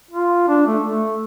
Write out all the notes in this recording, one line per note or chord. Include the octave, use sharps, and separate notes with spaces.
F4
D4
A3
A3